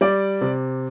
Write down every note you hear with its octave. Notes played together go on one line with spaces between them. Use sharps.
G3 D5
C3